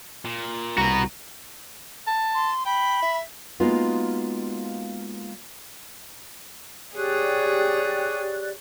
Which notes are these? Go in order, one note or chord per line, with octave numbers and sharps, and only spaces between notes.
A#2
C2 F#4 B4 A#5
A5
C6
G5 B5
E5
G#3 A#3 B3 D#4 F4 F#4
G4 G#4 C#5 D5 F#6